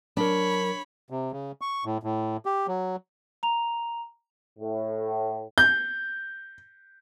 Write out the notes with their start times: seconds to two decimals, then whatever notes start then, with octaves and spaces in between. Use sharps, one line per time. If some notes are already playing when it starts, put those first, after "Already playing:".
0.17 F#3 D4 A#4 C#5 B5
1.10 C3
1.32 C#3
1.61 C#6
1.85 A2
2.03 A2
2.46 G4
2.68 F#3
3.43 A#5 F7
4.59 A2
5.58 G6